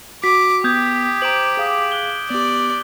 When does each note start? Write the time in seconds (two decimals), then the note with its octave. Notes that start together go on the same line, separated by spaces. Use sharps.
0.24 F#4 D6 B6
0.64 B3 G4 D#6 G6 G#6
1.22 C5 A#5 D6 D7 F#7
1.57 G#4 F5 D#6
1.92 F#6 G7
2.30 B3 G4 D5